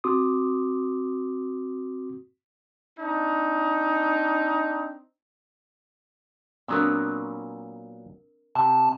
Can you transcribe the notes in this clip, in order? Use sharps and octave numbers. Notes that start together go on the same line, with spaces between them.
C4 F#4 C6 D6 D#6
C4 D4 D#4
A#2 F#3 B3 C4 D4 A#4 D#6 E6
C3 C4 A5